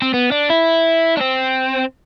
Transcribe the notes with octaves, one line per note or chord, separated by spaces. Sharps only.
C4
B3
D4
E4
D4
C4